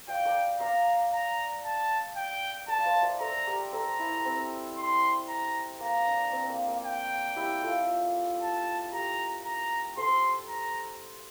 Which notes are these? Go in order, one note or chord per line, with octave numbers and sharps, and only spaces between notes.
D5 F5 G5
A#4 D5
D5 F5 A#5
A#5
A5
G5
A#4 D5 A5
F5
C5 E5
A#4 D5
A4 C5 A#5
G4 A#4
A4 C5 A#5
E4
C4
C6
A#5
A#3 A#5
D4
C4
A#3
A#3
G5
E4 G4
F4 A4
A5
G4 A#4 A#5
A#5
A4 C5 C6
A#5